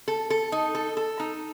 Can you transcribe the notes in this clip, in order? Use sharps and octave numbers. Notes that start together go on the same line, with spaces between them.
A4
A4
D#4
A4
A4
D#4